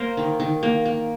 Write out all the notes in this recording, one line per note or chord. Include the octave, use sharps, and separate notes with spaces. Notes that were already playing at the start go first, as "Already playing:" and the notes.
Already playing: A#3 A#4 C5
D#3
D#3
A#3
A#3